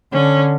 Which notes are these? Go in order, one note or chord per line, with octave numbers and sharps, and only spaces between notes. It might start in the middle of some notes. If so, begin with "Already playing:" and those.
D3 C#4